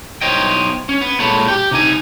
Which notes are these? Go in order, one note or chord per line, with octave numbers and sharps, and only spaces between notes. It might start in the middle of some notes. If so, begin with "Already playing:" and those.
B1 C#3 C5 C#5 D#5 G5
C#4
B3
A#2 G#3 A4 C#5 B5
G4 G5
C3 D#4 G#5